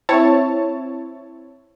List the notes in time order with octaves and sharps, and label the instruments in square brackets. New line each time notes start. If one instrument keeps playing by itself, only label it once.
[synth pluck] C4 E4 C#5 A5